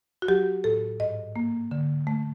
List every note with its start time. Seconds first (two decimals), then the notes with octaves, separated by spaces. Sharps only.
0.22 F#4
0.28 F#3 G4
0.64 A2 A4
1.00 G#2 D#5
1.36 A#3
1.71 D3
2.07 A3